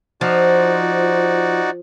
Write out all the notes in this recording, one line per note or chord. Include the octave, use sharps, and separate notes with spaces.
F3 D#4 F#4 D5